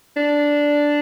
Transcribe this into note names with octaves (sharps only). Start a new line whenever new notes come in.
D4